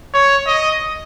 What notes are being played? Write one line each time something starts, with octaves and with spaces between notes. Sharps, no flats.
C#5
D#5